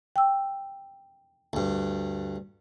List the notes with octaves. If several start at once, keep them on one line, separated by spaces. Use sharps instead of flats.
G5 E6
D2 G2